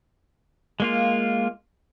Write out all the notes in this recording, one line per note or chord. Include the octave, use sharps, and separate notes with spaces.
G#3 A#3 F4